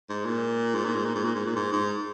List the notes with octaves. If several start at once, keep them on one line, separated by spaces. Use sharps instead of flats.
G#2
A#2
G#2
A#2
G#2
A#2
G#2
A#2
G#2
A#2
G#2
G#2